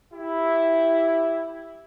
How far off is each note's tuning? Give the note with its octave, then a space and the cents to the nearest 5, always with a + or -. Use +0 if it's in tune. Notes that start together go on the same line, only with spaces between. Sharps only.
E4 +0 G4 +0